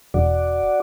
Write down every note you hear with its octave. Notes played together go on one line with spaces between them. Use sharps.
E1 F#4 D5